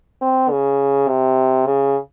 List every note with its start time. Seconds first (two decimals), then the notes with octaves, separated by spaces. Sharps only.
0.22 C4
0.51 C#3
1.08 C3
1.67 C#3